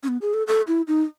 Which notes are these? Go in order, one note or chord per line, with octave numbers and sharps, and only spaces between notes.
C#4
B3
G#4
A4
A4
E4
D#4